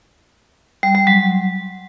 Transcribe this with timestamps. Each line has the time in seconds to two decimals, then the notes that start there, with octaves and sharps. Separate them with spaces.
0.83 G3
0.95 G3
1.07 F#3